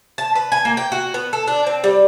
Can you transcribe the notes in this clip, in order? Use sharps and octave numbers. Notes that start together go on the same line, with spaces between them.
A5
B4
G#5
A#3
G5
F#4
B3
A4
D4
C4
G3